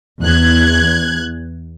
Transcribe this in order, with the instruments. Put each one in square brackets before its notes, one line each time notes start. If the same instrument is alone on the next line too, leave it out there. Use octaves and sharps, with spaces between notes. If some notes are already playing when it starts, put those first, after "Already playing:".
[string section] E2 F#6 G#6